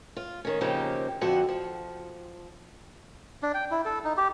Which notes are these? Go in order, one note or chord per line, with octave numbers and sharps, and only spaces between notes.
F4
D#3 C#4
C#3 F3 A#3 C4 D#4 G4
F2 D3 C4 F#4 F#5
F3
D4
G5
E4
A4
D#4
G4